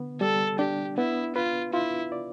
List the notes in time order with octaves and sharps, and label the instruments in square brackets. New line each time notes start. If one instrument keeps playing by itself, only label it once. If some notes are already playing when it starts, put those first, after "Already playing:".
Already playing: [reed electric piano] D3 B3
[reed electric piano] G3 [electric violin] A4
[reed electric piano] D4 [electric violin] G4
[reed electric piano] B3 [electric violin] E4
[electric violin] F4 [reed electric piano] B4
[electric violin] E4 [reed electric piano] F4
[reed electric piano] D5